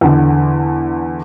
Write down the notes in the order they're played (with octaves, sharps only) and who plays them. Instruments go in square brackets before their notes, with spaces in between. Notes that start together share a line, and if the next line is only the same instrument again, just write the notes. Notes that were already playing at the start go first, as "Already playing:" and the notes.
[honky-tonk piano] E2 D3